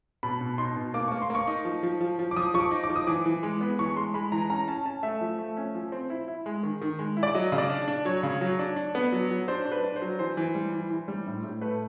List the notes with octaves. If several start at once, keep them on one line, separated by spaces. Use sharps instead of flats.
B2 B5
B2
D#4 C6
B2
A#3 D6
A#3 C#6
C6
A#3
C#6
D#4
F3
F3
F3
F3
D6
F3 D#6
F3 C#6
D6
D#4
D6
F3
D#6
E3 D6
E3
G#3
B3
E3 C#6
G#3 C6
G#3 B5
E3 A#5
C#4 A#5
C#4 A5
C#4 A5
A3 E5
F3
A3
C#4
F3
C4
E4
E4
G#3
D#3
D#3
G#3
E4
D5
F#3 D#5
C#3
D5
D4
D4
F#3 C#5
C#3
F#3
D4
D4
B3
F#3
F#3
D4 C5
D4
B4
D4
C5
F#3
E3 C5
E3
G3
E3
E3
G3
A2
A2
A3 B4